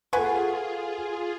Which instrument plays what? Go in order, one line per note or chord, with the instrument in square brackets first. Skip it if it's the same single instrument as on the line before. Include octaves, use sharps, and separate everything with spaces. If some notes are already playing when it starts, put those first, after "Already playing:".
[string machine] F4 G#4 [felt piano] A4 F#5 [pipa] B4 G#5 C#6